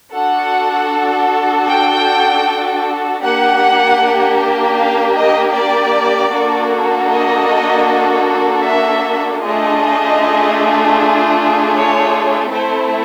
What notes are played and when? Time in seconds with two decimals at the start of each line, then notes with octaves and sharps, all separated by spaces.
0.13 D4 F#4 A4 F#5
1.68 G5
3.23 A#3 D4 G4 F#5
4.78 F5
5.16 D#5
5.55 D5
6.32 A#3 D4 F#4 A4
7.10 D#5
8.65 E5
9.42 A3 D4 F4 G#4 D#5
11.75 C#5
12.52 A3 C4 E4 A4 C5